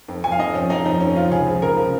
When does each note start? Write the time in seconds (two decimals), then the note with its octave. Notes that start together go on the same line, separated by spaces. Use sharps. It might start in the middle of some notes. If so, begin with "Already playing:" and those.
0.08 F2
0.24 F3 G#5
0.32 F5
0.39 F2 D#5
0.54 F3 C#4
0.70 F2 D#4
0.85 F3 D#4
1.00 F2 C#4
1.16 F3 F4
1.31 C#2 G#4
1.47 C#3 F3 G#4
1.62 C#2 A#4
1.77 C#3 F3